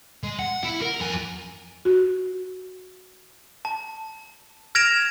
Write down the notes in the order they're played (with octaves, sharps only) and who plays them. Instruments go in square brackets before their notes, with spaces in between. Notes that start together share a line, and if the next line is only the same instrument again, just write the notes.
[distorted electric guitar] G#3
F#5
E4
A#4
F2 G#5
[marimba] F#4
[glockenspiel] A5
F6 G#6 A#6 D7 E7 F7